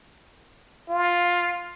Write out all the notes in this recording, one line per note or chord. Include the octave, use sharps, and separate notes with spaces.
F4